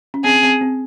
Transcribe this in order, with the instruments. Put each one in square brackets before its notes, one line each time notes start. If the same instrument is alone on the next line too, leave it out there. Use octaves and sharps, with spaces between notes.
[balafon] C#4
[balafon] C4 [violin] G#4
[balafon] C4
C4